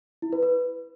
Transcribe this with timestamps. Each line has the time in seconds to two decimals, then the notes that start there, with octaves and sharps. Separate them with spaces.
0.22 E4
0.33 B4
0.43 B4